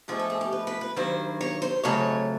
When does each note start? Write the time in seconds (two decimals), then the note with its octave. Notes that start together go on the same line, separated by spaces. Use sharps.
0.08 G#2 F3 A3 G#4
0.19 A4
0.30 G#4
0.41 G4
0.53 B4
0.67 B4
0.81 B4
0.96 G2 D#3 F#3 C5
1.41 C#5
1.62 C5
1.84 F2 C#3 F#3 A3 C#5